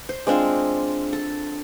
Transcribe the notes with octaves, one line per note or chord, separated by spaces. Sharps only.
C5
G#3 C4 D4 F4
A4